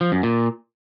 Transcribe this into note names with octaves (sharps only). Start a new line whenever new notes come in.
F3
F#2
A#2